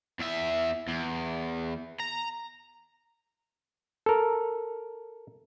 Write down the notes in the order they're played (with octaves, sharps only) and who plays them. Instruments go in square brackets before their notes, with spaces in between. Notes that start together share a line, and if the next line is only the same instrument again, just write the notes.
[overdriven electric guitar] E2 E5
E2
A#5
[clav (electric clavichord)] A4 A#4